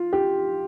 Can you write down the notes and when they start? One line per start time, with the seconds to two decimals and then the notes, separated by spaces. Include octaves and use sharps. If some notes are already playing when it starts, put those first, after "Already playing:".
Already playing: F4
0.13 G4